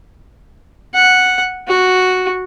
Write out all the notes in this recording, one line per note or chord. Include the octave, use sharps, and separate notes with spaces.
F#5
F#4